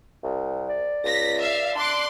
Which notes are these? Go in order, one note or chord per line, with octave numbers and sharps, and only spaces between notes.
C2
D5
C#2 A#6 B6
E5 F5
D4 C6 D6 F#6